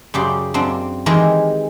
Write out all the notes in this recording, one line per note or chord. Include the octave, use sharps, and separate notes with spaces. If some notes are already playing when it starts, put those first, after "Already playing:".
F#2 C#3 G4 D5 C6
F#2 A#3 C4 D4 F4
D#3 E3 G#3 G4 A#4